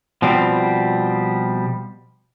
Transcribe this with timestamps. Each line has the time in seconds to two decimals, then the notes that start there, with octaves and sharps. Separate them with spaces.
0.22 B2 F3 G3 C4